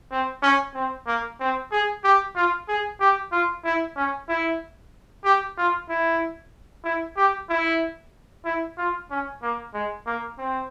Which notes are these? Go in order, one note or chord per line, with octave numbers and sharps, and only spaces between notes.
C4
C#4
C4
A#3
C4
G#4
G4
F4
G#4
G4
F4
E4
C#4
E4
G4
F4
E4
E4
G4
E4
E4
F4
C#4
A#3
G#3
A#3
C4